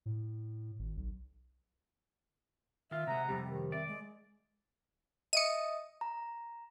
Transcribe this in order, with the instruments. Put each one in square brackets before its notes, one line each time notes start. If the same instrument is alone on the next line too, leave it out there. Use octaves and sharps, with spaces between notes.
[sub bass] A2
G#1
B1
[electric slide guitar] D#3 F4 [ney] E5
[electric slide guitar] C3 G#3 [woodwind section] F#5 A#5
[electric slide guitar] F2 C3 G3 [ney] G4
[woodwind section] D#3
[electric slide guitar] D5 [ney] E5
[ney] G#3
[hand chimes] D#5 E5 D#6 [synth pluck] C#7 D#7
[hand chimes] A#5